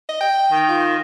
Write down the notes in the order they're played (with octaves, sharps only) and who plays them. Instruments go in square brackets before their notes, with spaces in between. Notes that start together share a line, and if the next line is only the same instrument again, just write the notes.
[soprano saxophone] D#5
G5
[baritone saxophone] D#3
[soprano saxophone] F4